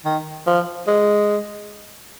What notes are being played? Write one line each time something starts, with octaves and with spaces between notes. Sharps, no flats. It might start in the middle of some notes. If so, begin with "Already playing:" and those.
D#3
F3
G#3